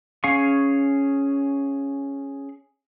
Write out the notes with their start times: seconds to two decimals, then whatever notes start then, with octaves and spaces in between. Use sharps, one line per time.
0.24 C#4 G#4 F5 C#6